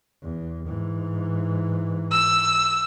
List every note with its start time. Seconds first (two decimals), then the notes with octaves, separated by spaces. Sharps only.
0.22 E2
0.66 G#2 E3
2.11 E6